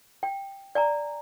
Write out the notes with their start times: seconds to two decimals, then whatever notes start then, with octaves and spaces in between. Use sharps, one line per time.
0.23 G5
0.75 D5 G#5 A#5